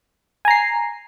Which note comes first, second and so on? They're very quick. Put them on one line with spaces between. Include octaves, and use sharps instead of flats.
G#5 A#5 C7